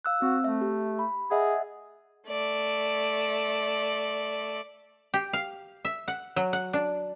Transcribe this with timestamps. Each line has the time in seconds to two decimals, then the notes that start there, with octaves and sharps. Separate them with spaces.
0.05 F5 E6 F#6
0.22 C4 F#4
0.44 A3 E5
0.61 G4
0.99 B5
1.31 G#4 D#5 E5 F#5
2.28 A3 D5
5.14 G4
5.33 F5
5.85 E5
6.08 F#5
6.36 F#3
6.53 F#5
6.73 D4